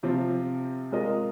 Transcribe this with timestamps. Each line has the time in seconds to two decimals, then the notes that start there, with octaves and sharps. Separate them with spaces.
0.03 C3 F3 C4 F4
0.92 G#3 F4 A#4 D#5